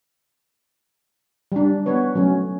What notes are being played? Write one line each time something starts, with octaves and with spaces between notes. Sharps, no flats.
G3 D4
B3 B4 C#5
F#3 A3 C#4